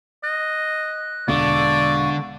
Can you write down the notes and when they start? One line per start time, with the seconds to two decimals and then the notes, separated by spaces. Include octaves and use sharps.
0.24 D#5 F#6
1.28 E1 D3 D5 F5 C#6